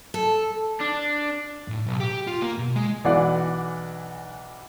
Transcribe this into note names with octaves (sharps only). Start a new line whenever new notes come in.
A4
D4
A2
B1
G4
F4
A#3
B2
G#3
B1 E3 D5 F#5